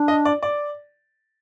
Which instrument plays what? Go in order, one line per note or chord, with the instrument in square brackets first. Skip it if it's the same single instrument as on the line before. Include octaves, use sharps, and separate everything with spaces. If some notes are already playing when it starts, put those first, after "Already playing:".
Already playing: [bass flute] D4
[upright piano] D#5
D5
D5